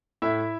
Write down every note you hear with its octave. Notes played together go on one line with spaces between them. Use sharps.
A2 E4 E5